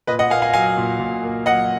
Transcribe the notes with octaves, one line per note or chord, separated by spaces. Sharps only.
A#2 B4 D#5
D#5 F#5
A#3 F5 G#5
F5 G#5
F#3 F5 G#5
A#2
A#2
A#3
F#3 D#5 F#5